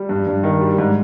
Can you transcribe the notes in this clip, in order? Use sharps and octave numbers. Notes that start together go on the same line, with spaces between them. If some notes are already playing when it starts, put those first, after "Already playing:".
Already playing: G3
G2
G2
D#3
G3
G#2